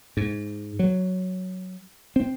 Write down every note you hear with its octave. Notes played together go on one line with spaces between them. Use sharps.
G#2
F#3
C4